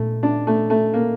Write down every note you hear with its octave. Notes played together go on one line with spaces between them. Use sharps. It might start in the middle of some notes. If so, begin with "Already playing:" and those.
Already playing: A#2 A3
D4
A3
A3
A#3